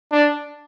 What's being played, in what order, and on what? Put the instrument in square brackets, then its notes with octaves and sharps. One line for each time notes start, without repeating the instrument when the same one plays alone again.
[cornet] D4